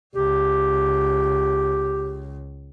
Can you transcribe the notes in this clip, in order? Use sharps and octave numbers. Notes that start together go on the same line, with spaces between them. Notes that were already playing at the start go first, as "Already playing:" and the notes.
C#2 G4